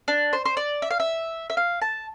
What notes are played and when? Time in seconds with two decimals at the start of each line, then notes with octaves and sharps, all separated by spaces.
0.08 D4
0.33 C5
0.45 C5
0.57 D5
0.82 E5
0.91 F5
1.00 E5
1.50 E5
1.57 F5
1.82 A5